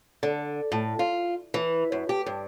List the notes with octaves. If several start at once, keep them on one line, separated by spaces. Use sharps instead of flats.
D3
A2
F4
E3
F#2
G4
G2